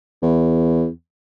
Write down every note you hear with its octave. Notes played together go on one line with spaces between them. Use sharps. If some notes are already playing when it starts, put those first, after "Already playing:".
E2